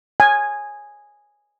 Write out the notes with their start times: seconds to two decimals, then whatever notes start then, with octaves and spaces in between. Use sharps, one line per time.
0.20 G#5